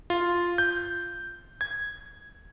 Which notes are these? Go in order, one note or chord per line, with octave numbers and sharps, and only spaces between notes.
F4
G6
G#6